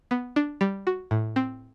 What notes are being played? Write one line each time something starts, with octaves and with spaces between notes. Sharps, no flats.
B3
D4
G3
F#4
A2
C4